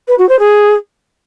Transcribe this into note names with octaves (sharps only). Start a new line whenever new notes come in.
B4
F#4
C5
G#4